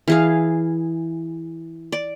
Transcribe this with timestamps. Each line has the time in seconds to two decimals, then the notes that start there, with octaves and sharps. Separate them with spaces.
0.08 E3 G#4 F5
1.92 D5